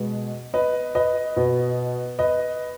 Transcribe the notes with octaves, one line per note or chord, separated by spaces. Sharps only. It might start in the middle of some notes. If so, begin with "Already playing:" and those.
Already playing: B2 G#3 B3
B4 D#5
B4 D#5
B2 B3
B4 D#5